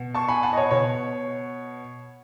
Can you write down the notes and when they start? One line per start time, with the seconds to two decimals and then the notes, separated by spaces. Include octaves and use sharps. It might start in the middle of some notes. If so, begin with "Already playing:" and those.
Already playing: B2
0.15 A5 C#6
0.28 G#5 B5
0.43 F#5 A5
0.53 D#5
0.57 C#5
0.71 B2 C#5